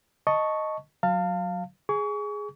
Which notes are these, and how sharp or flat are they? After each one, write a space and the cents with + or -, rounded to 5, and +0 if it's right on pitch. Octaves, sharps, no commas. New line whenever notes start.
D#5 +0 A5 +0 C#6 +0
F#3 -10 F5 +0 A5 +35
G#4 +0 C#6 +35